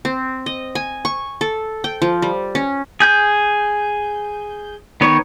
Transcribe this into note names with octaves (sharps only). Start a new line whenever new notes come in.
C4
D#5
G#5
C#6
A4
G5
F3
G3
C#4
G#4 G6
D#3 B3 C#5